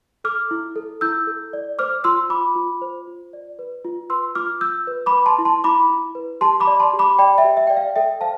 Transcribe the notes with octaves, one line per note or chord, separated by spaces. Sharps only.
A4 D6 F6
E4
A4
E4 E6 G6
A4
D5
C5 D6 F6
F4 C6 E6
F4 B5 D6
F4
C5
F4
D5
B4
F4
B4 C6 E6
F4 D6 F6
F4 E6 G6
B4
B5 D6
B4
A5 C6
E4
A5 C6
E4 B5 D6
E4
B4
G4 A5 C6
B5 D6
D5
A5 C6
G4
B5 D6
D5 G5 B5
E5 G5
G4
E5
D5 G5
F5
A4 E5 G5
C5 F5 A5